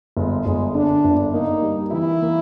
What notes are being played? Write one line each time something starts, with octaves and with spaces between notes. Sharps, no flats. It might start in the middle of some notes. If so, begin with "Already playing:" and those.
G1 G#3
G1 G#3
D3 D4
G1
A#3 D#4
G3
E3 E4
A#3